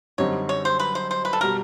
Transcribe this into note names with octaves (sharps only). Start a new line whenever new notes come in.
F#2 D3 G3 C4 D#4 C#5
C#5
C5
B4
C5
C5
B4
A4
B2 G3 A#4